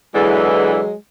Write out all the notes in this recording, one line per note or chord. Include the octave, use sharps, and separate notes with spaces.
E2 D3 E3 F#3 G#3